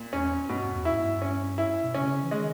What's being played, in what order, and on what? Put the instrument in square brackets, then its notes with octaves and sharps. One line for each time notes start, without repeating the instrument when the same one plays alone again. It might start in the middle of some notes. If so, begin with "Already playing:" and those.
Already playing: [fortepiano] A#2
[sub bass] E2 [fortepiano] C#4
[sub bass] G2 [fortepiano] B2
[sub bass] E2
[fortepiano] E4
[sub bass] G#2
G2
[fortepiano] C#4
E4
[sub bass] B2
[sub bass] C#3 [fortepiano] C#4
[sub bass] E3
[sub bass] D#3 [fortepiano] G#3